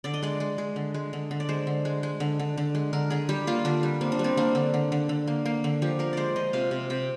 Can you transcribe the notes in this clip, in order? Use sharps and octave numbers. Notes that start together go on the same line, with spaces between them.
D3 D5
D#5
G#3 D5
G#3
G#3
D3
G#3
D3
D3
D5
G#3 C5
D3
G#3
G#3
D3
D3
D3
G#3
D3 A#4
D3 G#4
G3 G4
A#3 F4
D3 D4
G3
A#3 C4
D4
G3
C4
A#3 D4
D3
D3
D3
D3
A#3
A#3
D3
F3 G4
F3 A#4
G#3 C5 D5
F3 D#5
C3 F5
C3
C3 G5